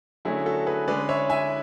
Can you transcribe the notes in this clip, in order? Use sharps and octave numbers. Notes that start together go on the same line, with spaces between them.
D3 F#3 A3 C#4 E4 G#4
F#4 A4
G#4 B4
D3 G#3 C#4 B4 D5
C#5 E5
E5 G#5